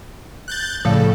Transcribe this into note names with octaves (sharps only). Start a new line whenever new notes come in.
F#6 G6 A6
A2 C#3 F3 A4 F5